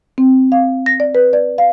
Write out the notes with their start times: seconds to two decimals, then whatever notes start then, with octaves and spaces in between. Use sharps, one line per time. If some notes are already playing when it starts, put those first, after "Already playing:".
0.18 C4
0.52 F5
0.86 A#6
1.00 D5
1.15 B4
1.33 D5
1.58 F5